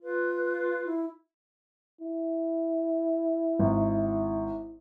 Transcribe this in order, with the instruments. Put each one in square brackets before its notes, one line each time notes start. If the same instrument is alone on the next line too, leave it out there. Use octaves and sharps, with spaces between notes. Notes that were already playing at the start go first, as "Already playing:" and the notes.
[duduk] F4 [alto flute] B4
[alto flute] E4
[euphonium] E4
[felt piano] G#1